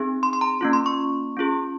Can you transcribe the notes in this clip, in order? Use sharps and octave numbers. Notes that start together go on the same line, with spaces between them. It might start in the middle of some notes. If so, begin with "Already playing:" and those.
Already playing: C4 D#4 G#4
C6
C6
A#5
A#3 C#4 F4
C6
C#6
C#4 F4 G#4